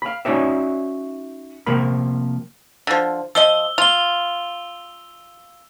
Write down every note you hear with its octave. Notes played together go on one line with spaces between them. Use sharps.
F5 B5
C#4 D#4 F#4 C#5 D5 E5
C3 F3 A#3 A#4 B5
D3 F3
F3 D#5 E6 G7
F4 F7 G7